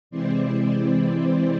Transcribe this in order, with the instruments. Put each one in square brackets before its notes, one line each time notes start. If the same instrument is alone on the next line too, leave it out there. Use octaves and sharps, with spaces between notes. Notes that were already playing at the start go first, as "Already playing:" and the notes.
[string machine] C3 E3 G#3 C4 E4 C5 D5